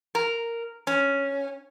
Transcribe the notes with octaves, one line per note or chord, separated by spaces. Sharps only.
A#4
C#4